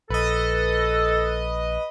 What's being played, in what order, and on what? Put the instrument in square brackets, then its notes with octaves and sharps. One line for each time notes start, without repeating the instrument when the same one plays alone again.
[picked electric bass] A#1 [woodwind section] A4 [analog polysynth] B4 D#5